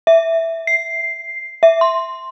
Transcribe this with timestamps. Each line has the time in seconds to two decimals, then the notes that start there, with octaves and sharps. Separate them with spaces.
0.07 E5
0.67 C7
1.63 E5
1.81 C6